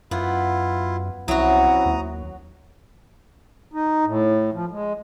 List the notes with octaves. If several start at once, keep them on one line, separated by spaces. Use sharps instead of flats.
F#2 B3 E4 F4
C2 F#3 C4 C#4 E4 F#4 A#5 D#6
D#2
D#4
A2
F3
G#3